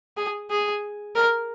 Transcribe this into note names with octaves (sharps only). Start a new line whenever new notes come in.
G#4
G#4
A#4